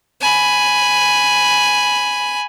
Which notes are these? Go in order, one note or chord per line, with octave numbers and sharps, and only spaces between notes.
G#5 B5